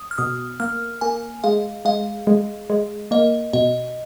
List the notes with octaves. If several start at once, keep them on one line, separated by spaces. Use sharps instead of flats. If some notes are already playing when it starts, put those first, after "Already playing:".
Already playing: D#6
F6
B2 D#6
A#3 F6
A#3 G#5
G#3 F5
G#3 F5
G#3
G#3
A#3 D#5
B2 D#5